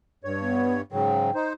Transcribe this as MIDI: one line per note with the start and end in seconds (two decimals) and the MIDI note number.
0.24 0.82 43
0.24 0.82 73
0.40 0.74 59
0.92 1.30 44
0.92 1.30 49
0.92 1.30 54
0.92 1.31 79
1.35 1.53 63
1.35 1.53 72